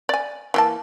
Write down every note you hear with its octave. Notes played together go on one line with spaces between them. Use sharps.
D5 G#5
E3 A#3 A5